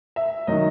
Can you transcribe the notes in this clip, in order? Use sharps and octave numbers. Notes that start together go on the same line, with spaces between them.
E5
D#3 F#3 D#5